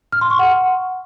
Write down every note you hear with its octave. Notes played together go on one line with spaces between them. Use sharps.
F6
C6
C#6
F#5